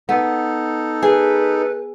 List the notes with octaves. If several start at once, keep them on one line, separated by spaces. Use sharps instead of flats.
B3 D#4 A4
G#4 B4